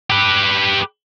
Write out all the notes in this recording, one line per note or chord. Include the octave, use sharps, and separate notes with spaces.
G4 B4